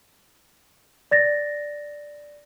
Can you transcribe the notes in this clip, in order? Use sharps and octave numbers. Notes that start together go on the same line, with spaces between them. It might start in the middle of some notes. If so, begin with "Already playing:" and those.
D5 A6 A#6